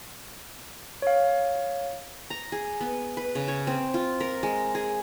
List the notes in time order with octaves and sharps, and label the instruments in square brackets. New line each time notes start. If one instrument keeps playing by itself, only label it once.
[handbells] C#5 F5
[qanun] A#5
G#4
B3
B4
C#3
C#5
C4
F4
A#4
G#3
G#4